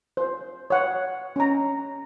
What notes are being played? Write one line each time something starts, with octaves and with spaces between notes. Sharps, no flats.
C5
C#5 F#5
C#4 A#5